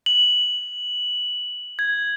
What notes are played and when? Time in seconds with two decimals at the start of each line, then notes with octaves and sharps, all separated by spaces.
0.06 F#7
1.79 G#6